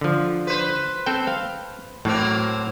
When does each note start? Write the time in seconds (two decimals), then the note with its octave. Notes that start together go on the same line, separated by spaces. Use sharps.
0.01 D3 F3
0.47 B4 C5
1.06 C4 A4 G5
1.27 F5
2.05 A2 F#3 A#3 C4